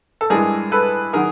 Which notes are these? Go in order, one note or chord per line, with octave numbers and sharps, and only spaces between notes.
A4
G2 E3 G#3 G#4 A#4
A4 B4
D#3 F#3 G#4 A#4